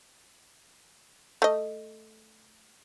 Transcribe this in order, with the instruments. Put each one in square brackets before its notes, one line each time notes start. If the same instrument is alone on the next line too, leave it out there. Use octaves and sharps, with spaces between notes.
[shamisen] A3 D#5